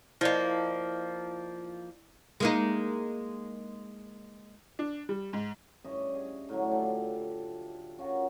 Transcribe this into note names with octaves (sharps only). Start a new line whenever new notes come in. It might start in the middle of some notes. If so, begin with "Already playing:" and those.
F3 A#3 E4 D5 D#5
G#3 A#3 D#4
D4
G3
G#2
G2 C#4 D#5 E5
G#4
A2 D3 F#3
F4 G4 A4
C#4 F4 F#4 A#4